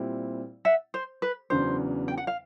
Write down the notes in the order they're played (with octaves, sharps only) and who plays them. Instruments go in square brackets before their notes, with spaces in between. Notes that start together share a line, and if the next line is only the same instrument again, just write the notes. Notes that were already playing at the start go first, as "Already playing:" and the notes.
Already playing: [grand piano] A#2 G3 C4 E4
[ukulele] E5 F#5
C5
B4
[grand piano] E2 C#3 F#3 B3 D4 [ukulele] C5
[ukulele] G5
F#5
F5